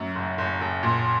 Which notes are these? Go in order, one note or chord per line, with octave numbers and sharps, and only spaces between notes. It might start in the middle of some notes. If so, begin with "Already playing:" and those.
Already playing: F#2
F#1
F#1
F#1
A#2